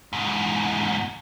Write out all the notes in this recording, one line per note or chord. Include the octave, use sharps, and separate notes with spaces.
E2 G#2